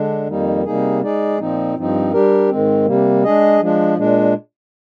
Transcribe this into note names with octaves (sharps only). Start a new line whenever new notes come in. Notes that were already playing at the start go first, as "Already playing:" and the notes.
Already playing: D3 G#3 D4
F2 D#3 G3 A#3 D#4
C3 G3 A#3 D#4 G#4
G#3 D#4 G#4 D5
A#2 F3 C4 D#4
G2 F3 C4 D#4
G3 D4 G4 A#4
G#2 D#3 G#3 C4
C3 G3 A#3
G#3 D4 G#4 D#5
F3 G#3 D4
A#2 G#3 D4